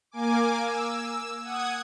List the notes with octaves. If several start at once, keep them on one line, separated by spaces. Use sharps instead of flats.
A#3 G#5 D6
E6
F#5 D#6 G#6